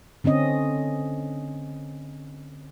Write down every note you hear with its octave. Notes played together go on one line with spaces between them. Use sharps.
D3 C4 C#4 D#5